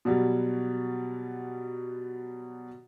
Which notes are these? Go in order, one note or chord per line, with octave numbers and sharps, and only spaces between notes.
B2 F#3 G3